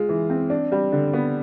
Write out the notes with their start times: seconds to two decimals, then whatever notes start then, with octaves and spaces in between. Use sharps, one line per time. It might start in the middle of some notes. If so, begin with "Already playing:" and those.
Already playing: G#3 F4
0.09 E3
0.30 C4
0.50 D4
0.72 G3
0.92 D3
1.13 B3